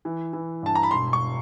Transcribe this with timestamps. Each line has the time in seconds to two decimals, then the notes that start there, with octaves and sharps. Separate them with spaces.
0.05 E3
0.33 E3
0.63 G2 A5
0.75 A#5
0.83 B5
0.91 E1 C6
1.13 C#6